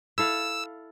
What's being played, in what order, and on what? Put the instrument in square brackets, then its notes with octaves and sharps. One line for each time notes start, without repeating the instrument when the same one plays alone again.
[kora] E4 A4 F5 [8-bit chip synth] E6